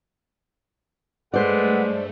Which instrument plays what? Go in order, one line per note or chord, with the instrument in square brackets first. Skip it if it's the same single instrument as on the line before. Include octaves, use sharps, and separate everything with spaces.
[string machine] G2 A3 [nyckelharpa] G#3 [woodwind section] A4 B4 F#5 [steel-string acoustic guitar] C5 D5